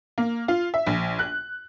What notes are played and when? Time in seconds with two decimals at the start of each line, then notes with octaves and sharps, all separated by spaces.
0.18 A#3
0.48 F4
0.74 E5
0.86 A#1
1.19 F#6